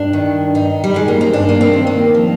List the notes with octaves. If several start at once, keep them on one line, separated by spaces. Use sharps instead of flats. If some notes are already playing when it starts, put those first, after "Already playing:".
Already playing: G2 D4
D#3
G2 D#4
G3
D#3 G#3
A#3
C4
G2 D4
A#3
C4
D#3
A#3
F3